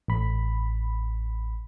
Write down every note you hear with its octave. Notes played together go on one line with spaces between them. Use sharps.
A1 B5